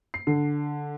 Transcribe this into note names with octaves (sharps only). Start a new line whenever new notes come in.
C7
D3